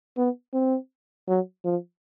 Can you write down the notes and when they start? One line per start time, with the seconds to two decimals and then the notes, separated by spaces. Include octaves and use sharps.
0.18 B3
0.53 C4
1.28 F#3
1.65 F3